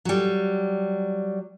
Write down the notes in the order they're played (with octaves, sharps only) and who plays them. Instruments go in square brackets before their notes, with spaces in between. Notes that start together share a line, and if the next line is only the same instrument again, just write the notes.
[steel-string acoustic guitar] F#3 G3